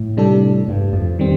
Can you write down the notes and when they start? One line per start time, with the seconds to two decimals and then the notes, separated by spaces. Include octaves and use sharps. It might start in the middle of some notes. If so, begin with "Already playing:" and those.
Already playing: A2
0.17 C3 G3 D4 A4
0.68 G2
0.93 F2
1.19 D#3 G3 C4